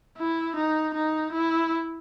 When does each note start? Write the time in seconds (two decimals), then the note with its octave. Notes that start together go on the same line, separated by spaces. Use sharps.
0.18 E4
0.56 D#4
0.94 D#4
1.33 E4